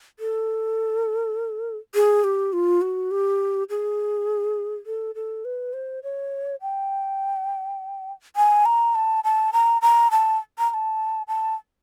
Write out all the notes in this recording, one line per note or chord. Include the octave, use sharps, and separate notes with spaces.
A4
G#4
G4
F4
F#4
G4
G#4
A4
A4
B4
C5
C#5
G5
G#5
A#5
A5
A5
A#5
A#5
A5
A#5
A#5
A5
A5